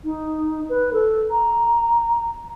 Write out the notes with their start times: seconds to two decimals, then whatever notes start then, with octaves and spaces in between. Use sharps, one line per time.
0.04 D#4
0.69 B4
0.93 A4
1.31 A#5